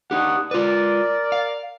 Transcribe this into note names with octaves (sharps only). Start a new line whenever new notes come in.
D4 D#4 G4 F#5 D#6
F4 A#4 B4 D5
F5